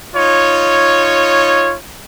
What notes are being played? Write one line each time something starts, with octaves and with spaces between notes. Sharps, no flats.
D#4 F4 C#5